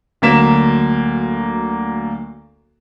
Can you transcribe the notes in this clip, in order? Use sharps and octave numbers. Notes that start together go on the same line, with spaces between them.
D2 F#3 A#3 B6 E7